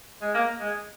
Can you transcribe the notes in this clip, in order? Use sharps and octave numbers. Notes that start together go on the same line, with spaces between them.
G#3
A#3
G#3